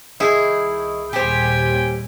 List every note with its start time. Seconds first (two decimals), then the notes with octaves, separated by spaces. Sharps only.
0.20 C2 D#3 E4 G#4
1.13 D#2 A#2 G3 G4 C5 G5 G#5